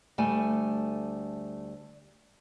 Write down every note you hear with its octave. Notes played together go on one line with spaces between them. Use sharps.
D2 G3 A3 G#5